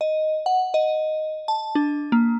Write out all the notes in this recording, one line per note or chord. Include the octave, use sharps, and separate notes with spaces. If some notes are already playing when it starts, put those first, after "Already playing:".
D#5
F#5
D#5
A5
D4
A#3